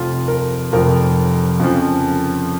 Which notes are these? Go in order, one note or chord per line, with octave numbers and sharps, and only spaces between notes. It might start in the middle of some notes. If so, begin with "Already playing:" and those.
Already playing: F1 F2 F3 F4
A#4
F1 F2 F3 A#4
F2 C#3 F3